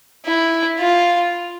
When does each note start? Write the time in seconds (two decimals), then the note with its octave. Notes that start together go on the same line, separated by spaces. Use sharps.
0.25 E4
0.80 F4